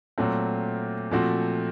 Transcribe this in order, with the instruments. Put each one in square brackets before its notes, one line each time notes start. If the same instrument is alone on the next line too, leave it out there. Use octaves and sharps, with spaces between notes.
[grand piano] A#2 F#3 A3 C4
A#2 F3 A3 C4 F#4